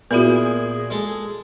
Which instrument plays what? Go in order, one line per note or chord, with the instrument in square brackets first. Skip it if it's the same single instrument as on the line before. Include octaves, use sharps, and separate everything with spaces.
[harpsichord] A#2 E4 [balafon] B3 F#4 [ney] G#4
[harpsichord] G#3 A4